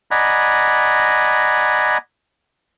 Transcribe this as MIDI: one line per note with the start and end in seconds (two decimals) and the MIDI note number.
0.11 1.98 74
0.11 1.98 75
0.11 1.98 78
0.11 1.98 80
0.11 1.98 82
0.11 1.98 83